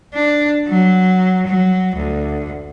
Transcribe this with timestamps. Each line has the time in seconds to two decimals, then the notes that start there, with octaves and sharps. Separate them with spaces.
0.14 D4
0.67 F#3
1.47 F#3
1.97 D2